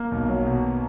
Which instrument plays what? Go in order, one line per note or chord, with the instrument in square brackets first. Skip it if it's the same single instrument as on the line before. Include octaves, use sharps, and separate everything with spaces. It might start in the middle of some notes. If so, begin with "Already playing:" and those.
Already playing: [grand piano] A#3
B1
F#3
B2